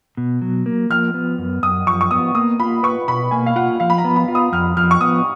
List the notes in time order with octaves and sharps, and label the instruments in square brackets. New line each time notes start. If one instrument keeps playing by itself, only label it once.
[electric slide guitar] B2
F#3
A#3
[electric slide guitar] F3 [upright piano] F6
[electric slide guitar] B3
F#2
[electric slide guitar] F#2 [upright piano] D#6
[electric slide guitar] F3 [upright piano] C#6
[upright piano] C#6
[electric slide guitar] B3 [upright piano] D#6
[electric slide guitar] A#3 [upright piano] D#6
[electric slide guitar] F4 [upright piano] B5
[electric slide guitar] B4 [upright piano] C#6
[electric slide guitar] B2 [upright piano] B5
[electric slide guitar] A#3 [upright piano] G#5
[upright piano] F5
[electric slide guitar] F4 [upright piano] F#5
[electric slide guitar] F3 [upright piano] F5
[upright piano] B5
A#5
[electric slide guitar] B3
[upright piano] B5
[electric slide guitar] F4
[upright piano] D#6
[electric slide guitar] F2 [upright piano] F6
[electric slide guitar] F3 [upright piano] F6
[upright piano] C#6
[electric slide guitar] B3 [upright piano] D#6